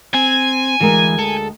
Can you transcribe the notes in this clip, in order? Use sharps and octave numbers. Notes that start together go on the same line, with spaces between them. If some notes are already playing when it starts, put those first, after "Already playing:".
C4 G#5
D2 E3 G#3 A#4
A4